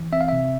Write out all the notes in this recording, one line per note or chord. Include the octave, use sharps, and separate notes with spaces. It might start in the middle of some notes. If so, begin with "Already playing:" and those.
Already playing: E3
C4 E5
F5
C3 E5